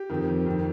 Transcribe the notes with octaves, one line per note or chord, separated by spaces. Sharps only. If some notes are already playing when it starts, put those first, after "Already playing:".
Already playing: G4
F2 D#3
F2 D#3